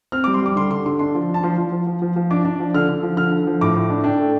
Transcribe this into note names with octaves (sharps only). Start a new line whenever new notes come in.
C4 F6
D6
G3
C6
G3 D6
D3 C6
D3 C6
D3 C6
D4 C6
F3
D4
A5
F3 C6
F3
F3
F3
F3
F3
D4 D6
D4
F3
D3 F6
D3
F3
D3 F6
D3
F3
A2 D6
A2
D4
D4 G5
A3